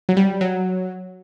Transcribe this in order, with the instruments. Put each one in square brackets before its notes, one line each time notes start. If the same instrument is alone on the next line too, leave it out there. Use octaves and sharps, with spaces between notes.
[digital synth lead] F#3
G3
F#3